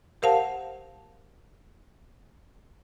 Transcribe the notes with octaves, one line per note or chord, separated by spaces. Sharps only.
G4 A#4 C5 F5 F#5 A5